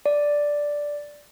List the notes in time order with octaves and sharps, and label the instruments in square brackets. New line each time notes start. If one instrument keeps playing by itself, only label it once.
[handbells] D5